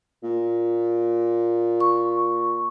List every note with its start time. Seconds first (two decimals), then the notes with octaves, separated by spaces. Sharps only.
0.23 A#2
1.81 C#6